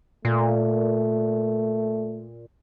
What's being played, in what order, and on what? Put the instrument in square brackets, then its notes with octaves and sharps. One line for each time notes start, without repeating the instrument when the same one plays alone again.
[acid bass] A#2 [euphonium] A3